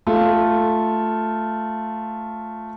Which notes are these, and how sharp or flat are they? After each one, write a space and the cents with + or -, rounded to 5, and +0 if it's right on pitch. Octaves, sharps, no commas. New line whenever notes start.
A3 +0 F4 +0